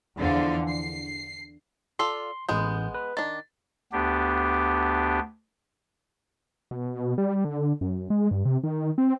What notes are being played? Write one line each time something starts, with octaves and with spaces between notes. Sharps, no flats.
E2 D3 F3 F4
C7
F4 A4 D5 C6
A1 G#3 B3 G6
B4
D#3 D4 A6
D2 B3 D4 G4
B2
G3
D3
F#2
G#3
G2
C3
D#3
C4